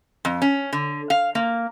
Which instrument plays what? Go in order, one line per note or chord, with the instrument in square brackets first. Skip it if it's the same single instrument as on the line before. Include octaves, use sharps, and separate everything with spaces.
[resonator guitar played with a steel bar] F2
C#4
D3
F5
A#3